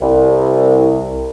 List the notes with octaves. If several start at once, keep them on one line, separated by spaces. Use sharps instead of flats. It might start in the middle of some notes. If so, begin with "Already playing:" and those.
C2